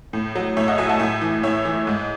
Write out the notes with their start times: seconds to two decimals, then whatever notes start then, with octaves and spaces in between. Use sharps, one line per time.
0.13 A2
0.35 F#3
0.57 A2 C#5 E5
0.68 D#5 F#5
0.78 F#3 E5 G#5
0.89 F#5 A5
1.00 A2 E5 G#5
1.22 E3
1.43 A2 C#5 E5
1.65 E3
1.87 G#2